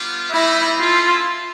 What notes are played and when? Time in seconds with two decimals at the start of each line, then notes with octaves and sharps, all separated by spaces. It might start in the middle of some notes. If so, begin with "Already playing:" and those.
Already playing: G3 B3 D4 F4
0.30 G3 C4 D#4 E4
0.77 C#4 E4 F4 A4